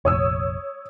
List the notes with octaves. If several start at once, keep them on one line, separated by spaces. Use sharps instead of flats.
F1 A#1 C#5 D#6 E6